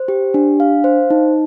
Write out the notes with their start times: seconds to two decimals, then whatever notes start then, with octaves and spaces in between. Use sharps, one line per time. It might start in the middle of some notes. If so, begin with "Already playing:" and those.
Already playing: C5
0.08 G4
0.34 D4
0.60 F5
0.84 C5
1.10 D#4